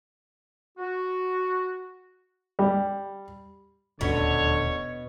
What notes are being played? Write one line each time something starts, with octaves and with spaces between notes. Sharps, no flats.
F#4
G3
D#1 D2 B2 D3 C#4 C#5